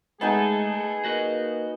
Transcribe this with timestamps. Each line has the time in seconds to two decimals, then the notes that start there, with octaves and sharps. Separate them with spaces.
0.21 G#3 A3 B3 D#4 G#4 A4 G#5
1.05 A#3 F#4 B4 D#5